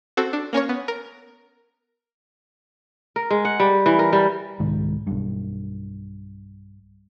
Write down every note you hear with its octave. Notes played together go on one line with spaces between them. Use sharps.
C4 F#4 A4 C5
D4
A#3 C#4 A#4 C#5
B3
A#4
A#4
G#3
F#5
G3
E3
A#4
G3
C2 G#2 D#3 G#3
B1 G2